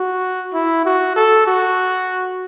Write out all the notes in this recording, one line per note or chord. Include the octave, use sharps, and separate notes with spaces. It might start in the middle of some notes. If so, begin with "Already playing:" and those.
Already playing: F#4
E4
F#4
A4
F#4